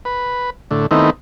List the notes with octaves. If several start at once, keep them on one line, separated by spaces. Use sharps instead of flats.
B4
A2 D3
D#3 A3 B3 C4 D#4 E4